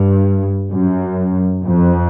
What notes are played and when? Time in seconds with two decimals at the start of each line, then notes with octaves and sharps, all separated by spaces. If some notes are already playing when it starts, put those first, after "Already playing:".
Already playing: G2
0.71 F#2
1.65 F2